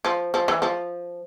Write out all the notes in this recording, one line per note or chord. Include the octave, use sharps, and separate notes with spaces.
F3
F3
E3
F3